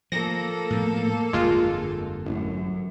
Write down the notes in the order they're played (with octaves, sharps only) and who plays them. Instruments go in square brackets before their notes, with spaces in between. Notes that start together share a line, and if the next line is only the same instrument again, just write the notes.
[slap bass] F3 [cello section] A#3 A4 [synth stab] A#6
[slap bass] A2 F3 B3
[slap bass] G1 F2 [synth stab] G#3 F4
[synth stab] A1 [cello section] F#2